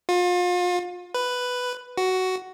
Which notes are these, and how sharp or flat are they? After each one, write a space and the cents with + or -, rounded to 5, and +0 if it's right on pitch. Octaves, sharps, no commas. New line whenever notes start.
F4 +35
B4 +5
F#4 +10